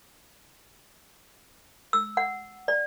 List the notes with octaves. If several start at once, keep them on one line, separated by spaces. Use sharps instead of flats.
E6
F#5
D5